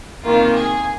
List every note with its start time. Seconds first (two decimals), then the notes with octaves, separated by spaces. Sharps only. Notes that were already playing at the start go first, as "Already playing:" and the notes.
0.24 C3 D#3 A#3 F4
0.54 G#4